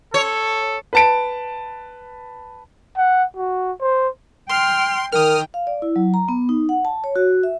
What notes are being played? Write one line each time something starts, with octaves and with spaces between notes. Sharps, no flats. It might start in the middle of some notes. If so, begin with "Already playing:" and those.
A4 C#5
B4 A5 D7
F#5
F#4
C5
G5 C6 F6
D#3 A#4 G5 D#6 F6
F5
D5
E4
F#3
A#5
B3
D#4
F#5
A5
C#5
F#4
E5